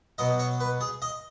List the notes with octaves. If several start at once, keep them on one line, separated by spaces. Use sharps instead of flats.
B2 F#3 D#5
C#5
B4
G#4
D#5